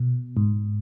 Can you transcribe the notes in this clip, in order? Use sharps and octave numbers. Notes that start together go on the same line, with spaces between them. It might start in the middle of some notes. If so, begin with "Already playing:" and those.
Already playing: B2
G#2